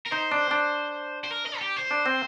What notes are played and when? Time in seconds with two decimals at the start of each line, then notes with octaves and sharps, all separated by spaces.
0.07 A#4
0.11 D#4 C5
0.31 D4
0.51 D4
1.25 C5
1.31 A#4
1.46 D#5
1.57 A4
1.61 G4
1.76 C5
1.91 D4
2.06 C4